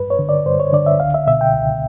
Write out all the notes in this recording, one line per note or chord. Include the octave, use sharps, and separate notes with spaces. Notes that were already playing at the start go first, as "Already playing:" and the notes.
Already playing: G2 B4
C#5
D3
D5
G2 C5
C#5
D3 D5
E5
C#2 F5
E5
B2 E5
G5
C#2